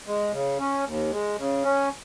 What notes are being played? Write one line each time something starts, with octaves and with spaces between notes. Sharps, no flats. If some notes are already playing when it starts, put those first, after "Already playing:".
G#3
C#3
C#4
D#2
G#3
C#3
C#4